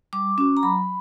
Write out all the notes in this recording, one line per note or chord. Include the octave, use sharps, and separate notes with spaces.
G3 D6
C#4 F#4 D6
A#5
F#3 B5